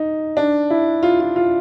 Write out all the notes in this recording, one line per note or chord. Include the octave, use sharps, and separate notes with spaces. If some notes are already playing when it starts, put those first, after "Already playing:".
Already playing: D#4
D4
E4
F4
F4
F4